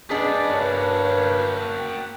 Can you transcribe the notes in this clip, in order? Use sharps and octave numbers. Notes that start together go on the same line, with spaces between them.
B3 D4 G#4 B4 D5 D#5
G2 A#3 F#4 C#5
G5